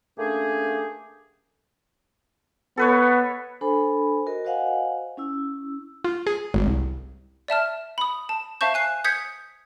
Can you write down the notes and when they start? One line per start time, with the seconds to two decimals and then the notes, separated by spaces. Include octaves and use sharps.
0.18 A3 A#3 C#4 D4 G4 G#4
2.77 B3 A4 B4 C#5
3.61 D4 A4 C5 G#5 B5
4.26 F#4 A#4 D#5
4.45 F#4 C5 D#5 F5 F#5 G#5
5.17 C#4 E4 E6
6.04 F4
6.27 G#4
6.54 G#1
6.66 C2
7.48 D5 E5 A5 F6
7.98 B5 D#6
8.29 A5
8.61 C5 E5 F5 A5 C#6 G6
8.74 G#5 F#6 C7
9.04 D#6 G6 G#6 B6 C#7